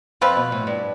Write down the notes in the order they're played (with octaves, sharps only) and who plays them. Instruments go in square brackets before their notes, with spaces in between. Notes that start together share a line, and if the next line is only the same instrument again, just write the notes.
[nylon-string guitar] F2 [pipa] F3 C4 F4 B4
[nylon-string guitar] B2
A2
G2